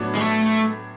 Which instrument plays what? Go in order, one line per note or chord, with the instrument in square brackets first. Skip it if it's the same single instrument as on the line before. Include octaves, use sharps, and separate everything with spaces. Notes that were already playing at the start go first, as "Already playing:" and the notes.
Already playing: [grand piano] A2 F#3 B3 D4
[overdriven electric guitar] G#3
A3